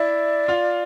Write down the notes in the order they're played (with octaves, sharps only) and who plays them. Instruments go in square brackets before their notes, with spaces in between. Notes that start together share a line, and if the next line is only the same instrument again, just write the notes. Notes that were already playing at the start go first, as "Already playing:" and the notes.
Already playing: [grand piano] E4 E5 [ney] D5
[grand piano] F4 F5